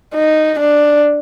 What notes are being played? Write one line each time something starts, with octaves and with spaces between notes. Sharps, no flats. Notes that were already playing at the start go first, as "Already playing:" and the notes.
D#4
D4